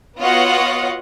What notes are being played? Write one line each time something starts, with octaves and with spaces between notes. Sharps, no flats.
B3 F4 F#4 C#5 D#5 F#5